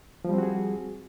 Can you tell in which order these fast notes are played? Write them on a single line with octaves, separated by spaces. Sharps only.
F3 G3 C4 F#4 G#4